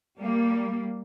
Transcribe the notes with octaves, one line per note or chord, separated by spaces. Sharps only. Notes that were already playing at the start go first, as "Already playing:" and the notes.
G3 A#3